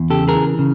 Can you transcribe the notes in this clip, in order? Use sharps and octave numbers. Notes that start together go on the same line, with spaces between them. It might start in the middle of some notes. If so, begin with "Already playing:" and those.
Already playing: E2
C#3 G4 A4
G#4 A#4
E3
C#3